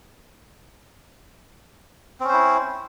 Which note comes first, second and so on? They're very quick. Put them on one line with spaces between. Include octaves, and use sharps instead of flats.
C4 C#4 C5 E4